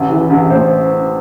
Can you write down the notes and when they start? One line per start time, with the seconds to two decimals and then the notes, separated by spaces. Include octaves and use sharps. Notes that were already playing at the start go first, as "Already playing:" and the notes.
Already playing: A1
0.10 E3
0.30 A1
0.50 A2 C5